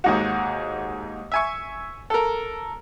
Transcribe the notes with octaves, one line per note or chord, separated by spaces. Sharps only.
D#2 G#2 F#4
E5 G#5 C#6
A4 A#4